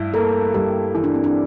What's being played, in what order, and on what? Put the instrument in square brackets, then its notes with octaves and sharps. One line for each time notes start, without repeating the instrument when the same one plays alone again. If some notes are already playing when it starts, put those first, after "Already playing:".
Already playing: [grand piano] G2 E4
[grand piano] A#3 [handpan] A4
[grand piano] G2 [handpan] G4
[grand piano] E3 [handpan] E4
[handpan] D4
C4
D4